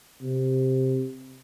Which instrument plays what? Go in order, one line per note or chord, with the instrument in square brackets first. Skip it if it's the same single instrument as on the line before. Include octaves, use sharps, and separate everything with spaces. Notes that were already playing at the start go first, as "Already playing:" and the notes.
[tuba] C3